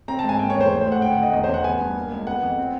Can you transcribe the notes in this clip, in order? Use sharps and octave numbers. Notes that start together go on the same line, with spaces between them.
C4 A#5
A5
G#2 G#5
A#3 G5
C#5
E2
C5
A2
C5
A2
F#5
D2 G5
F#5
D2
D#5
E2 D#5
C5
E2
F#5
B3 G#5
G2
A#3
C#2
B3 F#5
F2
C4